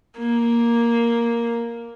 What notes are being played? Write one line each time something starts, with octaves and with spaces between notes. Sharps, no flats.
A#3